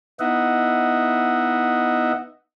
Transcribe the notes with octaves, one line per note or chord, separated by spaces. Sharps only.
B3 D#4 E4 D#5 E5 F#5